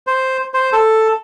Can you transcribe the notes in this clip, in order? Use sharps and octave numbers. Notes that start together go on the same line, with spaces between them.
C5
C5
A4